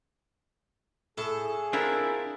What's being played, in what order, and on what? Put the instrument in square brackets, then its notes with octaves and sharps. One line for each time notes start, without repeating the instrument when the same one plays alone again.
[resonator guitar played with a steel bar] A2 [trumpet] G#4 [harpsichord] A4
[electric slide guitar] C4 E4 [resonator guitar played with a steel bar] D4 F4 A#4